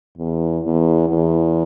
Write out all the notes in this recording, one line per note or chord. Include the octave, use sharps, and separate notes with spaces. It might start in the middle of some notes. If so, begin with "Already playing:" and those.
E2
E2
E2